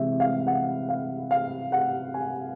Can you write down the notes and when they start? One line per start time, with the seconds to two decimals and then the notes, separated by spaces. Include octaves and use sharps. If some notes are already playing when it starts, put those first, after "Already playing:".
Already playing: C3 E3 G#3 C4 E5
0.20 F5
0.47 F#5
0.89 F5
1.31 F5
1.72 F#5
2.14 G#5